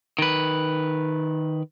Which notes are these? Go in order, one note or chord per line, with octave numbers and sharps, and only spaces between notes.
D#3 B4